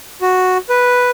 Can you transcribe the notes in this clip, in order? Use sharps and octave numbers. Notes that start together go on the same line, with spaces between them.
F#4
B4